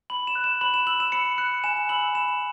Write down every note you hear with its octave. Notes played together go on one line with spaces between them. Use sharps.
B5 F#7
E7
F#6
E7
B5 F#7
E7
E6 F#7
E7
B5 C#7
F#6 C#7
G#5 E7
B5 E6 F#7
B5 E7